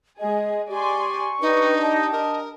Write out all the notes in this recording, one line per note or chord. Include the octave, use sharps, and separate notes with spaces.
G#3 G#4 D#5
G4 D5 G#5 C6 C#6
D4 D#4 G4 B4
D#5 A5
A#4 D#5